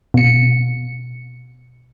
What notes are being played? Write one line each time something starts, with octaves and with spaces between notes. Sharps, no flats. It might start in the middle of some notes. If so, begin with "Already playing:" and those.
B2 C#7